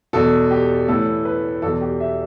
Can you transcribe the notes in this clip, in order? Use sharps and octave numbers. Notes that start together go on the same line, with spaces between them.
E2 B2 A4
G4
A2 E3 A4
B4
E2 B2 A4
G4
E5